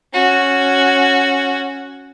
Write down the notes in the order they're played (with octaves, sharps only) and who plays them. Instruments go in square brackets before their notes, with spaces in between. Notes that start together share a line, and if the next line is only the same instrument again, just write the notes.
[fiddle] C#4 F#4